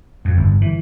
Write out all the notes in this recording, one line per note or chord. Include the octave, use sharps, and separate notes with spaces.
F2
G1
E3